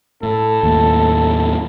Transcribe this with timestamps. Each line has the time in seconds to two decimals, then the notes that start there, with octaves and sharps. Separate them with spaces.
0.23 A2 A4
0.63 D#2 A2